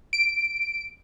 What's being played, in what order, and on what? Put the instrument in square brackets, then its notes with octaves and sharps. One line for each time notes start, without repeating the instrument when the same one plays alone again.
[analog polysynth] D7